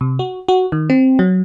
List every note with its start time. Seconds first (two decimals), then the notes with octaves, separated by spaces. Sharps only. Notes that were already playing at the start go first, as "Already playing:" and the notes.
0.01 C3
0.19 F#4
0.48 F#4
0.72 D#3
0.90 C4
1.19 F#3